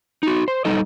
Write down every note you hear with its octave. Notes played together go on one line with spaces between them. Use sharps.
D#4 F#4
C5
G3 D#4 A4 D#5